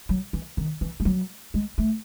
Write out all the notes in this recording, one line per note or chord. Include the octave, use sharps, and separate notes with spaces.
F#3
E3
D#3
E3
G#3
F#3
G#3
A3